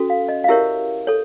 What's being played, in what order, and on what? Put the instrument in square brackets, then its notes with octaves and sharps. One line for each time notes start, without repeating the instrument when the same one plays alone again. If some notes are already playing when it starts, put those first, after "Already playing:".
Already playing: [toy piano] C#4 F#4 A4
F5
D#5
F5
E4 G4 A#4 C#5 E5
A4 C#5